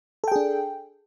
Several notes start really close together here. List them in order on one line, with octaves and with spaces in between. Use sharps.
A4 G5 G#4 D4